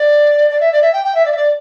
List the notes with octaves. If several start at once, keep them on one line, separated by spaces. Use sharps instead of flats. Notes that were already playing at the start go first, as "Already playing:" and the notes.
Already playing: D5
D5
E5
D5
E5
G5
G5
E5
D5
E5
D5